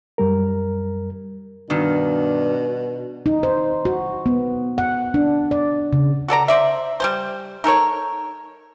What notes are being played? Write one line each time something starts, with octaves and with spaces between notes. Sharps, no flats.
F#2 G3 A#4
G2 B2 D#3 D4
D#4
C5
F#4
B3
F#5
D4
D5
C#3
F#4 A4 D5 A#5
C5 D5 E5
G3 G#3 C5
D#4 A4 A#4 C#5